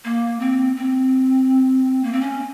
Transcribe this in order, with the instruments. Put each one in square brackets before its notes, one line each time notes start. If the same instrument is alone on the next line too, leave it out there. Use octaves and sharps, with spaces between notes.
[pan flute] A#3
C4
C4
A#3
C4
C#4